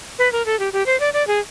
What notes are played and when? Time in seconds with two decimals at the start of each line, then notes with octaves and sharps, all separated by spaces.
0.19 B4
0.32 A#4
0.46 A4
0.59 G4
0.73 G4
0.86 C5
1.00 D5
1.14 D5
1.27 G#4